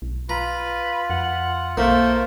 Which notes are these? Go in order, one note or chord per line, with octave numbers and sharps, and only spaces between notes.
B1
F4 B4 A#5
F2 F#5
B1 A3 A#3 F4 A#4 C5